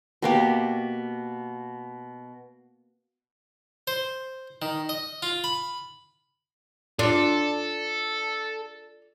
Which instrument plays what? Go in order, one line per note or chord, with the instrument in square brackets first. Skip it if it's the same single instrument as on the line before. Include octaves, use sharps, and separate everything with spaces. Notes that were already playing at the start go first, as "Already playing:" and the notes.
[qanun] B2 A#3 G4
[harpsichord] C5
D#3
D#5
F4
B5
[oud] D4 F4 [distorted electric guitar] A4